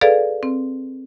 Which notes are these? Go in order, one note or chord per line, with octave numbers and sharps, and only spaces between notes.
G#4 A4 B4 D5 F5
C4